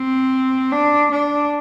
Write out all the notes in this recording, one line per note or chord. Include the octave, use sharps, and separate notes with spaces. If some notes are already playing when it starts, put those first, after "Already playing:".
Already playing: C4
D4
D4